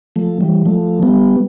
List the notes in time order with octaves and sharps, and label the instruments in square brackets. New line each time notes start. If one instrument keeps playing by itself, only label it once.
[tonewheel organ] F3 A3
E3 G3
F3 A3
G3 B3